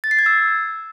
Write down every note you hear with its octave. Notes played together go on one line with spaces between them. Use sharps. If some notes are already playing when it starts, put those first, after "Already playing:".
A6
C7
G#6
E6